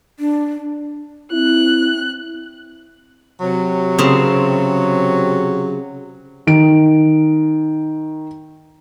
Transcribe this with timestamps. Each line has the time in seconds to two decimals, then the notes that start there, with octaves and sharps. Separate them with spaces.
0.19 D4
1.32 C4 E4 F#6
3.41 C3 F#3
3.99 C#3 C4
6.47 D#3 D7